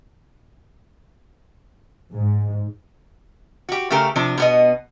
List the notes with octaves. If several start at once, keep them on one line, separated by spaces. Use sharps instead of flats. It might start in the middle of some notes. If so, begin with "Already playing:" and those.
G#2
F#4 G4
C#3 A3 G4 A#4
C3 F3 D4
B2 B3 D#5